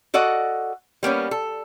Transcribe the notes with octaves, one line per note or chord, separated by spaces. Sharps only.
F#4 A4 D5 D#5 F#5
G3 A#3 B3 C#4
A4